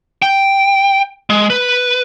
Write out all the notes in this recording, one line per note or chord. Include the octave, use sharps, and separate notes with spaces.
G5
G#3
B4